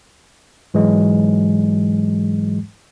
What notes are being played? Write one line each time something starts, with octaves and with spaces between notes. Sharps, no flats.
G#2 E3 F#3 G#3